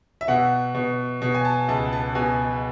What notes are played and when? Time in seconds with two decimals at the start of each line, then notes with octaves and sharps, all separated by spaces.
0.21 E5
0.28 B2 F#5
0.75 B2
1.22 B2
1.34 G#5
1.45 A5
1.68 C#2 A5
1.92 A5
2.15 B2 G#5